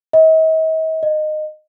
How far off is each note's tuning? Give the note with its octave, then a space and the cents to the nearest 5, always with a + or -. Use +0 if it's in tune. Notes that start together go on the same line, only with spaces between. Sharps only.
D#5 +45
D#5 -20